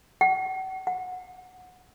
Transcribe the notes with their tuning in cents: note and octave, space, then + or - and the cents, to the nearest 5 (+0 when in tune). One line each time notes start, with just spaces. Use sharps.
F#5 +40
F#5 -20